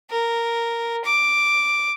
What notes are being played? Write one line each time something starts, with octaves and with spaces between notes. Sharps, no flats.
A#4
D6